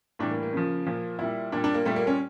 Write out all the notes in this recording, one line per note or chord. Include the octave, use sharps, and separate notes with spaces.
A2 E3 G3 D4
A#3
A#3
C#3 F3
A#2 F3
A#2 G3 E4
A#2 G3 D4
D4
A#3
A#2 G3 A3
A#3
C#4